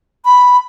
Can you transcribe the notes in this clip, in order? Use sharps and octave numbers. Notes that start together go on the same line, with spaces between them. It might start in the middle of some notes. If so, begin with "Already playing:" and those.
B5